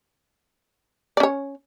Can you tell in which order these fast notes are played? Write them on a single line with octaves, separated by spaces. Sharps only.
D5 C#4 C#5